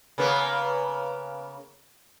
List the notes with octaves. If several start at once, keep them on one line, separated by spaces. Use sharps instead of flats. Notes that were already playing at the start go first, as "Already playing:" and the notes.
C#3 A#3 B3